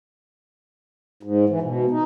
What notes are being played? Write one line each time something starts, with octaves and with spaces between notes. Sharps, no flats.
G#2
E3
B2
D#4